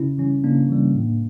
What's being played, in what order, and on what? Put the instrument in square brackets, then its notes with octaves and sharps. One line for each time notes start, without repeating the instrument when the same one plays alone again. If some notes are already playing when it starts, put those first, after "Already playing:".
Already playing: [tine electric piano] C#3 C#4 E4
E3 G3 C#4
C#3 A#3 D4
E3 G3
A2